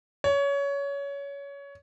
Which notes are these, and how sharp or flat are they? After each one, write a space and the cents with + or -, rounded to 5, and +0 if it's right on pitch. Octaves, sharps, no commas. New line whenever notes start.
C#5 +20